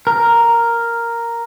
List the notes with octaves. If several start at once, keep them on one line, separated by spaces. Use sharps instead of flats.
A#4